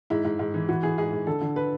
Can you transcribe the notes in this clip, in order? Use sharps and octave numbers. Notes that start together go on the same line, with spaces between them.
G#2 E4
G#2
G#2
E3
E3 F#4
E3 G#4
G#2 G#4
G#2
D3 A4
D3
B4